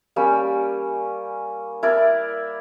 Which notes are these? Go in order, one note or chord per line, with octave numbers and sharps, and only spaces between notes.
G3 A#3 C#4
E4 A#4 D5